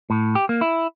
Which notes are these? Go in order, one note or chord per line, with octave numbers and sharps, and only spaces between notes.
A2
G4
A#3
E4